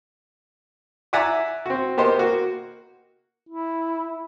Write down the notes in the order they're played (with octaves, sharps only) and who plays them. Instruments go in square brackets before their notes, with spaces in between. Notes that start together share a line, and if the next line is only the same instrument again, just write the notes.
[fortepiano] D5 E5 F#5 G#5 A#5 D6
C4 F#4
A#3 B3 G4 C5 D#5
A#3 F#4
[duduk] E4